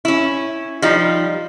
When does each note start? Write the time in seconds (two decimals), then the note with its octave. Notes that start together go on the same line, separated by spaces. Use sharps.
0.05 C#4 E4
0.82 F3 G3 D#4